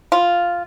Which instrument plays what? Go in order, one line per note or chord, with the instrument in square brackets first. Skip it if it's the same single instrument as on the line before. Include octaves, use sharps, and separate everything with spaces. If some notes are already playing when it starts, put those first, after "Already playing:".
[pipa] F4